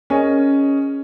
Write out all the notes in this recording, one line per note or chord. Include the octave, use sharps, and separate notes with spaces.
C#4 G#4 A#4 D#5